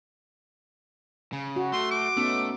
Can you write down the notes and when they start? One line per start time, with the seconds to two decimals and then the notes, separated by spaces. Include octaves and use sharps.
1.33 C#3
1.56 F#4
1.72 A3 C6
1.91 D6
2.17 A3 B3 C#4 D#4